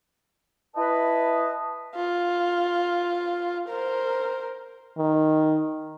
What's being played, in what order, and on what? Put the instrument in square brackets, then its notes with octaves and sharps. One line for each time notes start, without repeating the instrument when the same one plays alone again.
[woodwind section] E4 B4 D#5 A5
[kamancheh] F4
A#4 C5
[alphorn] D#3